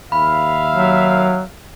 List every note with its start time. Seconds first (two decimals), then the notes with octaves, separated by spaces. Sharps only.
0.12 D#2 E5 F5 B5
0.72 F#3